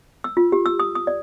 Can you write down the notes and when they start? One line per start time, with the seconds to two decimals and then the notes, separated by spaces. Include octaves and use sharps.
0.24 E6
0.37 F4
0.52 G4
0.66 E6
0.80 D#6
0.95 D#6
1.07 D5